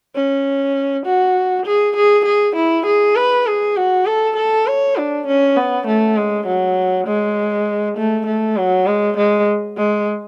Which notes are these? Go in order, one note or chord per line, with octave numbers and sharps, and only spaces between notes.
C#4
F#4
G#4
G#4
G#4
E4
G#4
B4
G#4
F#4
A4
A4
C#5
D4
C#4
B3
A3
G#3
F#3
G#3
A3
A3
F#3
G#3
G#3
G#3